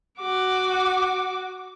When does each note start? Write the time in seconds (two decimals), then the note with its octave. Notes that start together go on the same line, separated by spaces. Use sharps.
0.19 F#4 D6